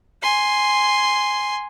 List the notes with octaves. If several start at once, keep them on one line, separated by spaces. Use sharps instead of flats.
G#5 C6